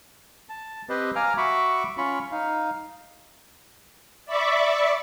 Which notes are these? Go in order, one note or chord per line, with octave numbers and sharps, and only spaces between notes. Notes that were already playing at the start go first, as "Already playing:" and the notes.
A5
C4 G4 B4 C5 D#5
F5 G#5 A#5 D6 F6
F#4 E5 B5 C#6 D6
C#4 F4 B5 C#6
D#4 F5
D5 E5 B5 C#6 D6